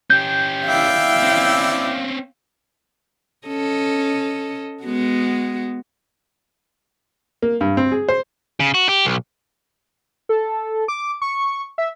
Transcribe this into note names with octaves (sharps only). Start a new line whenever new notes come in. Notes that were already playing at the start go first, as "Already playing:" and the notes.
C#4 G4 G6
E4 D5 E5 F5 G5
C4 C#4
C#4 A4 D#5
G#3 B3 F#4
A#3
G2
C4
G#4
C5
C#3
F#4
G4
B1
A4
D6
C#6
E5